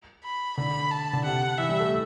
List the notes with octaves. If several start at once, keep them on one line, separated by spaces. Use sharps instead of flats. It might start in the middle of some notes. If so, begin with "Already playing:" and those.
B5
D3 B5
A5
D3
C3 F#5
E3 E5
G3
A3